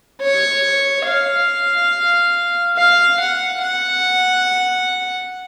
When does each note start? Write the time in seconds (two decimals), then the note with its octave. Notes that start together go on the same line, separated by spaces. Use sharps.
0.21 C#5
1.06 F5
2.77 F5
3.20 F#5
3.62 F#5